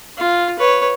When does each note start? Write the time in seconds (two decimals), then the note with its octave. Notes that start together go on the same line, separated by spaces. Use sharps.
0.17 F4
0.58 B4 C#5